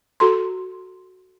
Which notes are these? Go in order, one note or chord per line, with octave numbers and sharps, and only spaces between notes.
F#4 A4 A#5 C6